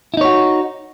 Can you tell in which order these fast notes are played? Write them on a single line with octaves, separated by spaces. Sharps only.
E4 D#4 C#5 F#4